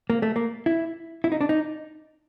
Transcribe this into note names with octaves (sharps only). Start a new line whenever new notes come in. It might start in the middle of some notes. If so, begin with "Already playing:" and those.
A#3
A3
A#3
E4
E4
D#4
D4
D#4